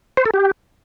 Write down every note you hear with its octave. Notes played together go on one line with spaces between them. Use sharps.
C5
A4
G4